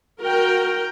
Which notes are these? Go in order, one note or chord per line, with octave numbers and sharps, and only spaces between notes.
F#4 A#4 G5